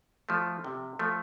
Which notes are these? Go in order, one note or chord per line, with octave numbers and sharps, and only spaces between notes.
F3 A3
C3
F3 A3